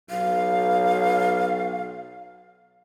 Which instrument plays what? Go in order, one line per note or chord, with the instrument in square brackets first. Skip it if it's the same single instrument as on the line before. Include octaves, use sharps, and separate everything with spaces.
[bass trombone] B1 [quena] F5